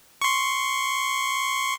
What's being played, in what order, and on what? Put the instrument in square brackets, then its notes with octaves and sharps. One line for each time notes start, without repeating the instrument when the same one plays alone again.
[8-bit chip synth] C6 C#6